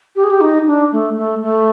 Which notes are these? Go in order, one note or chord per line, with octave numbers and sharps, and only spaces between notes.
G4
G#4
G4
D#4
D4
A3
A3
A3